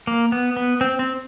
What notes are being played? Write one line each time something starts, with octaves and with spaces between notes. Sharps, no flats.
A#3
B3
B3
C4
C4